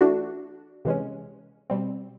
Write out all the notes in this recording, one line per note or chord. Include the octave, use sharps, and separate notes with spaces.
E3 A3 D4 F#4
C3 E3 G#3 C#4
B2 G3 C4